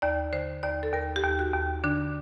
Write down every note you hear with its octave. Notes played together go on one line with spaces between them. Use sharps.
D#2 D5
D3 C5
D#2 D5
A4
D#2 A#4
G4
D#2
F#4
D#2
D3 D4